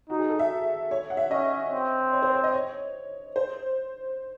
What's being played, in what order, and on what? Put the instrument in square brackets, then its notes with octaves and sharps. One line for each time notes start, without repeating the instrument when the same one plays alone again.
[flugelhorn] D#4 [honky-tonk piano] F#4
[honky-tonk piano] G#4
A4
E5
C#5
F#5
E5
[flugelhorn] C#4 [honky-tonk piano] D#5
[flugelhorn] C4
[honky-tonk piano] C#5
C5
C#5
D#5
C#5
C5